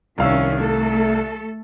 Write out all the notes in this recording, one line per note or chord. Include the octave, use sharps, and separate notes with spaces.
C2 D#3 F3 C#4 F5 E6
A3 A4